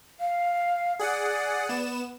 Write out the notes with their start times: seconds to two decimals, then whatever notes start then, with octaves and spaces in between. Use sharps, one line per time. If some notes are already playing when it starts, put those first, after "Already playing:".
0.20 F5
0.99 G#4 D5 F#5
1.69 B3 E7